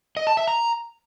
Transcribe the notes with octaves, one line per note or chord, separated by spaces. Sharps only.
D#5
A5
E5
A#5